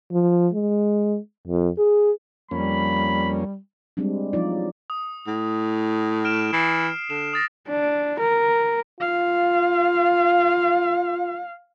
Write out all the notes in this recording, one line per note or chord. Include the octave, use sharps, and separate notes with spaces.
F3
G#3
F2
G#4
F2 G3 A#3 C#4 B5
G3 G#3 C4 D4
F3 F#3 G#3 D#4 F4 D5
D#6
A2
F6 D7 E7
E3 C7
D3 E7
D#6 A6 A#6
D4
A#4
F4 F5